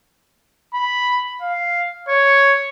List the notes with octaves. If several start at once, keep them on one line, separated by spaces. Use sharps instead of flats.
B5
F5
C#5